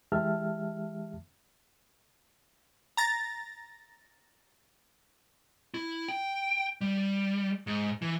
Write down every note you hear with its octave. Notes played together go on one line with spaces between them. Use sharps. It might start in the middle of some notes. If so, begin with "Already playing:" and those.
E3 G#3 G4 E5 A5 F6
A#5 A6 A#6
E4
G5
G3
G#2
E3